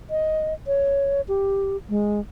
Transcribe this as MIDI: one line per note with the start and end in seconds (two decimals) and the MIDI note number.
0.10 0.54 75
0.67 1.21 73
1.28 1.77 67
1.89 2.20 56